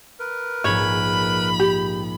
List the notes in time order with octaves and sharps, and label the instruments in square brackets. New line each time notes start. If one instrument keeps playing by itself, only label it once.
[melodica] A#4 B4
[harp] A#1 G#2 [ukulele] C#5 [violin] B5
[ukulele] G4